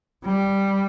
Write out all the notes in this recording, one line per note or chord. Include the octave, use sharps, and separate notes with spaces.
G3